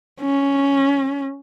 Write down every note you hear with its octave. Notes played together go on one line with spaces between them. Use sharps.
C#4